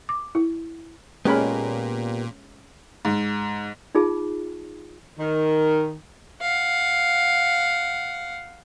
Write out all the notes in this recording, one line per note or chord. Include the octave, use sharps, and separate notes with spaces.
D6
E4
A#2 G#3 B3 C#4 G4 A#4 B5
G#2
D#4 F4 G#4 A5
D#3
F5 F#5